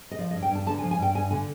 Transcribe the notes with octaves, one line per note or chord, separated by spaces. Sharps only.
D#5
F3 D5
D#5
G2
G5
G2 A5
D3 A5
G#5
F3
G#5
G2 G5
G2 G#5
D3 G#5